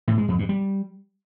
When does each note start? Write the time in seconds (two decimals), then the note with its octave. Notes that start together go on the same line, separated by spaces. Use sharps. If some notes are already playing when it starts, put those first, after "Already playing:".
0.08 A2
0.18 G#3
0.28 F2
0.39 G2
0.49 G3